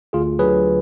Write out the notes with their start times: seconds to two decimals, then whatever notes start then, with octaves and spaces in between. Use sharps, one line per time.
0.13 D2 F4 G#4
0.39 D3 F#3 G#4 B4